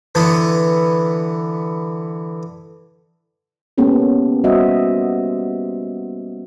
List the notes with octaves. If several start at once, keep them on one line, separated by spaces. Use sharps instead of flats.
D3 E3 B3
G#3 A#3 B3 C#4 G4 A4
G3 F#4 C5 D#5 E5